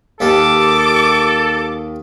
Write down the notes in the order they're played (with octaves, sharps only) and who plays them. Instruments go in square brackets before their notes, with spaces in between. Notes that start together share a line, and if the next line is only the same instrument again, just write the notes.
[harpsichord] D#2 D#3 G4 [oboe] A4 [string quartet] D6